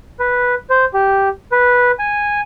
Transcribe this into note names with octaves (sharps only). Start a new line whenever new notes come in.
B4
C5
G4
B4
G#5